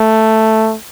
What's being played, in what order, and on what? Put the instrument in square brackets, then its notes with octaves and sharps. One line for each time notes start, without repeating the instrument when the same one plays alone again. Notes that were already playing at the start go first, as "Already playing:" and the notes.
Already playing: [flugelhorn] A3